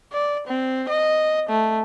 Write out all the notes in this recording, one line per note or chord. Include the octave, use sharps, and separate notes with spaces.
D5
C4
D#5
A3